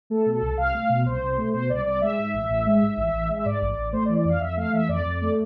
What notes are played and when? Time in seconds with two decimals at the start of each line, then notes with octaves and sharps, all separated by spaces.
0.10 A3 A4
0.26 B2
0.34 A4
0.42 C2
0.58 C2 F5
0.74 A3
0.90 B2
1.06 C2 C5
1.22 C2
1.37 A3
1.54 B2 C5
1.70 C2 D5
1.85 C2 D5
2.01 G#3 E5
2.18 G#2
2.33 A1
2.49 A1
2.66 G#3
2.82 G#2
2.97 A1
3.13 A1
3.29 G#3
3.36 E5
3.45 G#2 D5
3.62 A1
3.77 A1
3.93 A3 C5
4.05 D5
4.09 E3
4.18 D5
4.25 F2 F5
4.41 F2 E5
4.57 A3 F5
4.73 E3 E5
4.89 F2 D5
5.06 F2
5.21 A3